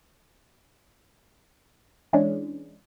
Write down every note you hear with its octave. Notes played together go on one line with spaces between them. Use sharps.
E3 G#3 C#4 D4